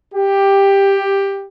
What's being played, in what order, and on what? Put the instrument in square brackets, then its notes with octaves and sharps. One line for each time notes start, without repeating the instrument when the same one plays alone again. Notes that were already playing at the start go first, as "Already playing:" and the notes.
[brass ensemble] G4